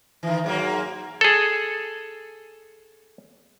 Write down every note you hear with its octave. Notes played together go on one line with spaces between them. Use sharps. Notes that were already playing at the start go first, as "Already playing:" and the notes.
D#3 E3
G#2 F#3 A#3
G#4 A4